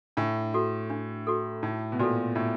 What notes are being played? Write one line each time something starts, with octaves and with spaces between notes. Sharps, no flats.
A2 D4
F#4 A4
D4
F#4 A4
A2 D#4
B2
A#2 F#4 A4
A2 D#4